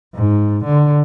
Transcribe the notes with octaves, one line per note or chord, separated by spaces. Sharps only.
G#2
D3